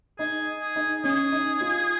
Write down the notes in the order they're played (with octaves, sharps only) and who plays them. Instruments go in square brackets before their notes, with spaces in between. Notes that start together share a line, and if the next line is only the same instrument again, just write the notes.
[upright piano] D#4 [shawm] G#4
[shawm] G#4
[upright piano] D#4
[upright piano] C#4 [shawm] G#4
[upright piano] D#4
F4